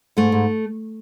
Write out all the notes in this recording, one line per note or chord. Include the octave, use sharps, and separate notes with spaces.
G#2 A3
G#2